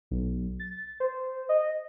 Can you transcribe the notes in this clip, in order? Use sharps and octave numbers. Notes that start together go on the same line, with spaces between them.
B1
A6
C5
D#5